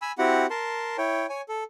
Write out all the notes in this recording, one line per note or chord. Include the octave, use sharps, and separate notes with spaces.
G#5 B5 E6
C4 E4 F#4 G4 F#5
A#4 A5 C6
E4 C#5 G5
C#5 G#5
A4